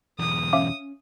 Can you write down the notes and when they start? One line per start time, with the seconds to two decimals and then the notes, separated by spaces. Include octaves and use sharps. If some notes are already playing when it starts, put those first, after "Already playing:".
0.19 B1 E2 D#6
0.53 C#4 E5 F5 D6